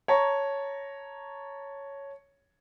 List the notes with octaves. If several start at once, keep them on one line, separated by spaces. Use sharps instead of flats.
C#5 A5 A#5 C#6